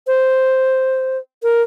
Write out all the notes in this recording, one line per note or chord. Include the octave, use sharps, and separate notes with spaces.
C5
A#4